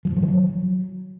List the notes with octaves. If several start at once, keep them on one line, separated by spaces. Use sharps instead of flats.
F3
G2
F3
E3
F#3